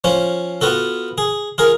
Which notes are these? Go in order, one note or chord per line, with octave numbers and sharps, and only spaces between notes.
F3 C#4 C5
B3 F4 F#4 A4
G#4
F4 G#4 A#4